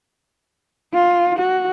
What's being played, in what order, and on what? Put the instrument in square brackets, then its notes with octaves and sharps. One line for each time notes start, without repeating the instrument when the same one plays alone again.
[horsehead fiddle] F4
F#4